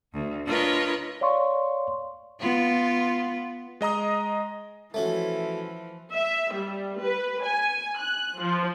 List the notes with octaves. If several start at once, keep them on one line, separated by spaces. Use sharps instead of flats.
D2
D4 F4 A#4 B4 C#5 D#5
C#5 D5 F5 C6 C#6
B3 F4
G#3 D#5 A#5 D#6
E3 F3 A3 C#4 F#4
E5
G3
B4
G#5
F#6
F3